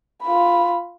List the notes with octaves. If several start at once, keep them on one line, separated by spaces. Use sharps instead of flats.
F4 B5